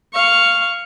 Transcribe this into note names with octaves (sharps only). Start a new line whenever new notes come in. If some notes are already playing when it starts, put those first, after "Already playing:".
F5 C#6